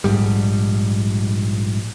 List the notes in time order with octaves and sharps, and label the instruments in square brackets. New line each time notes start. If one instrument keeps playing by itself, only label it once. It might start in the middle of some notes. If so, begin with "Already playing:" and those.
[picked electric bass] A#1 G#2 G3